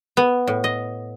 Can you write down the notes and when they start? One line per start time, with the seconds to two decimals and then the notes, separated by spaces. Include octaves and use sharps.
0.17 B3
0.47 A2
0.64 D#5